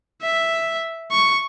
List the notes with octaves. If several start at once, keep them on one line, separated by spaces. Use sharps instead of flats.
E5
C#6